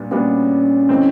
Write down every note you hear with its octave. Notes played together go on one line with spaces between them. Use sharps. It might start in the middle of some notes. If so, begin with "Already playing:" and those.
Already playing: A#2 G3 B3 D4
A#2 G3 B3 C#4 D4 F#4
E3 A3 C4 D#4